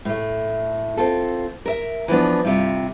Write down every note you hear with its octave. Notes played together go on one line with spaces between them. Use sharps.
A2 A3
C4 F4 A4
A#4 E5
E3 F3 B3 D4
G2 C3 F4